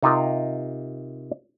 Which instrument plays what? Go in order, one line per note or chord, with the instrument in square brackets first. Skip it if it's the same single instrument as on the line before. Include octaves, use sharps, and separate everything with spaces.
[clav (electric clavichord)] C3 D#4 F4 A#4